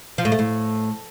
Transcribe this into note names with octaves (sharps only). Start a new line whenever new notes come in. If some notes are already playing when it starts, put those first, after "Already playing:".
F3
A2
A3
A2